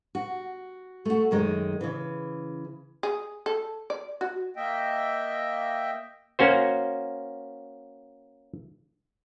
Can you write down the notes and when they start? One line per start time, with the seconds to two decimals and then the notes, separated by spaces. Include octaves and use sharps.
0.15 F#4
1.05 A3 F#4
1.31 F#2 D#3 G#3
1.81 C#3 E3
3.03 G#4
3.46 A4
3.90 D5
4.21 F#4
4.56 A#3 D#5 E5 G5
6.39 A#3 C#4 F#4 C5